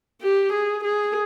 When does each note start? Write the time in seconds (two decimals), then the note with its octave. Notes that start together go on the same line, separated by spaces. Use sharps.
0.22 G4
0.52 G#4
0.84 G#4